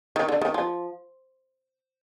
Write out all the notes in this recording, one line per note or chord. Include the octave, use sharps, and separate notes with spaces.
D#3
D3
D#3
F3